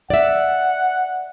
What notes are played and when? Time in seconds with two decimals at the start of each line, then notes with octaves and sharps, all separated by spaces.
0.10 D5 E5 F#5